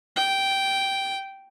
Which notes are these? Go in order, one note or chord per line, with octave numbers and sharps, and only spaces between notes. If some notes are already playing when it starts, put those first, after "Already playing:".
G5